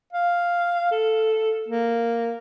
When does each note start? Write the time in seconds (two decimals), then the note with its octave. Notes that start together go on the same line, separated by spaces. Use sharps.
0.13 F5
0.91 A4
1.68 A#3